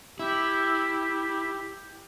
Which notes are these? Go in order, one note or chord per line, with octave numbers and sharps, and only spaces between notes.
E4 G4